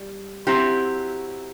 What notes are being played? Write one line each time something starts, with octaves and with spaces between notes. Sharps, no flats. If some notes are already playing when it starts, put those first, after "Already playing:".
Already playing: G3
F#3 C4 E4 G4